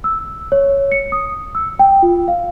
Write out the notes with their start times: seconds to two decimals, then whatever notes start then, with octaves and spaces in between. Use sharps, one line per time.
0.04 E6
0.52 C#5
0.92 C#7
1.12 D#6
1.55 E6
1.79 G5
2.02 F4
2.28 F5